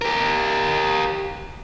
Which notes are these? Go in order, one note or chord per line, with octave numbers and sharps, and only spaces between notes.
G4 A#4